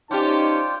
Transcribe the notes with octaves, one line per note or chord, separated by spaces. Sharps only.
C#4 D#4 F4 G4 C5 D5 G5 A5